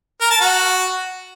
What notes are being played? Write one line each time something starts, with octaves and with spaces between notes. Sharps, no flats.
A#4
A5
F#4